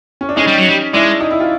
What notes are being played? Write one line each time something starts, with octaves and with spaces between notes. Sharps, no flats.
C#4
D4
G#3 C#4 D#4
G3
F#3
G3
G#3 D4 E4
D#4
E4
F4